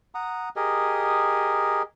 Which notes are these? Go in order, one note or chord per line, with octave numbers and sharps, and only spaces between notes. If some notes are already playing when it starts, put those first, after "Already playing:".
F#5 A#5 D#6
G4 G#4 A#4 D#5